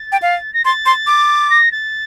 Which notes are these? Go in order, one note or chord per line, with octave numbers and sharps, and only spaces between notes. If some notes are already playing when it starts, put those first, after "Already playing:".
Already playing: A6
G5
F5
A#6
C6 A6
C6
D6
A#6
A6